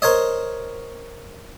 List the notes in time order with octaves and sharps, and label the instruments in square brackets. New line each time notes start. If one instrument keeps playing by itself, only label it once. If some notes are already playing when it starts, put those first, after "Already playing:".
[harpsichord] A#4 C5 C#5 D#5